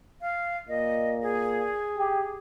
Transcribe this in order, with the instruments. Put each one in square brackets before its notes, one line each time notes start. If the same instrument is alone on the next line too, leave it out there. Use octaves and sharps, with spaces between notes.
[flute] F5
[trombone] A#2 [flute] D#5
[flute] G#4
[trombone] G4